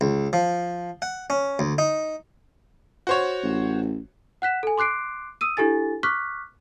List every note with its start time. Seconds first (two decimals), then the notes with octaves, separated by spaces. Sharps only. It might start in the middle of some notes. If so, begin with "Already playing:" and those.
0.01 C#2
0.33 F3
1.02 F#5
1.30 C#4
1.59 D2
1.78 D#4
3.07 F#4 C5 C#5
3.43 A1
4.42 F#5 F#6 B6 E7
4.63 A4 G#5
4.78 C6 D6 F#6 C7 D7
5.41 D#6 E6 D#7
5.57 D4 E4 G4 A4 G#5 A6
6.03 C#6 D6 F6 F#6 B6